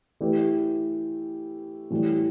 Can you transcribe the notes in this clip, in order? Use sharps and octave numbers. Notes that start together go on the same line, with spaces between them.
E3 A3 E4 G4 B4
A2 E3 G3